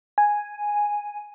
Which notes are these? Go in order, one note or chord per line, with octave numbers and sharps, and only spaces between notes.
G#5